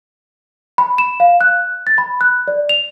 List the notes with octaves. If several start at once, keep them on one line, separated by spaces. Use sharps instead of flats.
B5
E7
F5
F#6
A6
B5
F#6
D5
F7